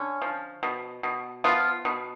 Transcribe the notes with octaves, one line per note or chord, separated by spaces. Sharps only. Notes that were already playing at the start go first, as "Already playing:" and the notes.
Already playing: D3 C#4
F3
B2
B2
F3 B3 F4
B2